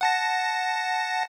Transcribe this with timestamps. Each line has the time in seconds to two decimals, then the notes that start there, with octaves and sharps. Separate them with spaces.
0.01 F#5 A5 A#6